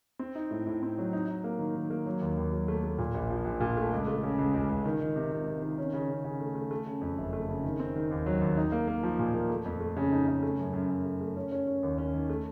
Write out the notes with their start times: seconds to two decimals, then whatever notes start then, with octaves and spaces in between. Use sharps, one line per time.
0.19 C4
0.35 D#4
0.51 A2
0.67 A2
0.83 C4
0.98 F#3
1.13 D#4
1.28 D#4
1.44 A#3
1.59 D#3
1.76 D#3
1.90 A#3
2.06 F#3
2.21 D#2
2.37 D#2
2.53 F#3
2.68 A3
2.84 A3
2.98 A#2
3.15 A#1
3.30 F3
3.45 A#1
3.60 A#2
3.77 A3
3.93 C#2
4.07 A3
4.23 C#3
4.39 C#2
4.54 C#2
4.69 C#2
4.85 D#3
5.01 D#3
5.16 C3
5.32 C3
5.47 C3
5.62 D#3
5.78 C#4
5.93 C#3
6.09 C#3
6.24 C#3
6.40 A3
6.55 A3
6.71 A3
6.86 C#3
7.01 F2
7.18 F#1
7.33 A3
7.49 C#3
7.64 D#3
7.79 C4
7.96 D#3
8.11 D#2
8.26 F#3
8.41 D#2
8.57 D#4
8.72 A#3
8.87 A#3
9.03 F3
9.19 A#2
9.34 A#3
9.50 A3
9.65 F2
9.80 A3
9.97 C#3
10.12 D#4
10.28 C#3
10.43 A3
10.59 F#2
10.74 F#2
10.90 F#2
11.05 A3
11.21 A3
11.37 C#4
11.52 C#4
11.67 C#4
11.83 D#2
11.98 C#4
12.14 D#3
12.29 A3